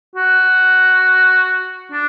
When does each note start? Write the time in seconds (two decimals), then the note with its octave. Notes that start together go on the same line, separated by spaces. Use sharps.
0.16 F#4
1.92 D4